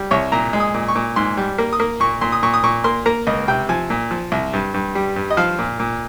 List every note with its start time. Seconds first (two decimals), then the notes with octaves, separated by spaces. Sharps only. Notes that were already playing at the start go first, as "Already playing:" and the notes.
Already playing: G3
0.11 C2 C#5
0.32 A#2 A#5
0.53 G#3
0.60 D#6
0.74 A#2
0.88 C#6
0.95 A#2
1.16 G#2 C6
1.37 G3
1.58 A#3
1.73 D#6
1.80 A#3
2.00 A#2 C#6
2.21 A#2 C6
2.32 D#6
2.43 A#2 C#6
2.54 D#6
2.64 A#2 C#6
2.84 A#3 C6
3.06 A#3 A#5
3.27 C#2 D#5
3.48 C3 G5
3.69 F3 G#5
3.90 A#2
4.11 F3
4.32 C2
4.53 G2
4.74 G2
4.95 G3
5.16 G2
5.30 D#5
5.37 F3 F5
5.59 A#2
5.80 A#2